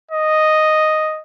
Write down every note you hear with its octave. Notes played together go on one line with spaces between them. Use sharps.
D#5